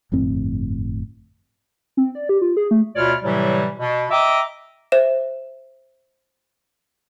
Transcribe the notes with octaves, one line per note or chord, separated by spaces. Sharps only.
G1 F2 A2 C4
C4
D5
G4
F4
G#4
A3
D2 B2 F4 C#5 D5 F6
A2 C3 E3 F#3 G3
B2
D#5 E5 G5 A#5 D6
C5 E5 E7